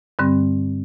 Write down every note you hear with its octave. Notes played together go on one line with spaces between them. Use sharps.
G2 D3 G3 C4